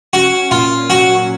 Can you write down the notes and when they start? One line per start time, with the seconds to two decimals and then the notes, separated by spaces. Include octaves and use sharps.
0.13 C#4 F#4
0.51 A#2 F4
0.89 F#3 F#4